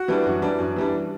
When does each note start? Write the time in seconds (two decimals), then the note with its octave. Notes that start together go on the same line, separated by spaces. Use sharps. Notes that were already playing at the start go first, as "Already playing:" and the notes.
Already playing: F#4
0.08 E3 G3 D4
0.26 F#2
0.42 E3 G3 D4
0.59 F#2
0.76 E3 G3 D4